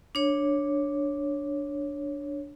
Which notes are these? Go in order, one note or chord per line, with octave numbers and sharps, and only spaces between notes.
D4 C#5